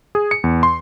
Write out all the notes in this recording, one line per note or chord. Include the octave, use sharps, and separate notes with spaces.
G#4
C#7
E2
C6